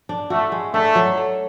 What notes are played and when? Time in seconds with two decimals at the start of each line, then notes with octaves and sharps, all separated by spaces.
0.09 D4
0.30 A3 F#4
0.52 G#3
0.74 A3 D4
0.95 F#3
1.17 A3